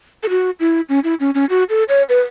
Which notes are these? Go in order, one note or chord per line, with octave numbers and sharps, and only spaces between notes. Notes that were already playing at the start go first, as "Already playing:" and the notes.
A4
F#4
E4
C#4
E4
C#4
C#4
F#4
A4
C#5
B4